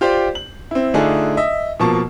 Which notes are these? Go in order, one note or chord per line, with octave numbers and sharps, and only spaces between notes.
F4 G4 C5 D5
F#7
C4 E4
D3 A3 D4 D#4 F4 G#4
D#5 E5
B2 F3 A#3 A5 C#6